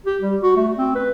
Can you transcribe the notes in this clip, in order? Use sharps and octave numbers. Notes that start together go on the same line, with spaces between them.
G4
G3
F#4
A3
C4
B4